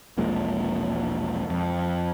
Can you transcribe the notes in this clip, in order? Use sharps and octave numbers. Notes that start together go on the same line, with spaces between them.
E1 A#1 A#2 G#3
F2